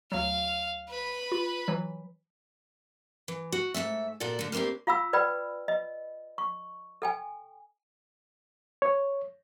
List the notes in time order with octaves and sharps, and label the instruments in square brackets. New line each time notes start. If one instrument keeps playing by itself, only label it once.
[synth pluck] D2 F#3 [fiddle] F5
[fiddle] B4 B5
[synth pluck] F4
E3 F#3
[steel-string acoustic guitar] E3
F#4
G#2 C#3 A3 E5
A#2 F#4 A4 D5
D3 A3
A2 A#3 C4 D4 G4
[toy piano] F4 F5 B5 E6
B4 D5 G5 B5
D#5
C#6
A4 G5 G#5
[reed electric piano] C#5